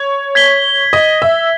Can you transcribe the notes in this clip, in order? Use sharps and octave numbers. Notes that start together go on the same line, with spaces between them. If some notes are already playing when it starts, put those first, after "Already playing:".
Already playing: C#5
G#6 B6 G7
D#5
E5